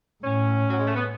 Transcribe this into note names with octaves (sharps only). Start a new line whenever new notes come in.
A2 C#4
F#3
G#3
A3
B3